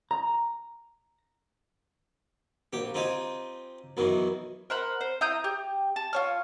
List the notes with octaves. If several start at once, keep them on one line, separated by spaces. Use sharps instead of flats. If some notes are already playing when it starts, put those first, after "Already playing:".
A#5
A#1 G4
C4 D#4 F4 G4 G#5
F#2 B2 D#3 E3
A#4 C5 F#5 B5
C5
E4 A#5 D#6 G6
G4
A5
F4 C#5 F6